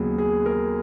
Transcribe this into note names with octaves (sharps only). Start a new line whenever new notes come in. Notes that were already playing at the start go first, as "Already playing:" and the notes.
Already playing: D#2 C#3 F#3 B3 G#4
G#4
A#4